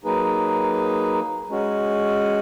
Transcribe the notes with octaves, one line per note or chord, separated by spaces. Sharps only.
F#3 A#3 D#4 G#4 B4
G#3 C#4 F#4